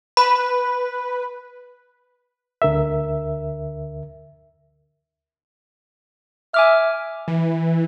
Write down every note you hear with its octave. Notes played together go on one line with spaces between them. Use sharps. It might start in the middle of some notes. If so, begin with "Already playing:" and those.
B4 B5
D2 D3 A#4 E5
E5 G#5 D6 F6
E3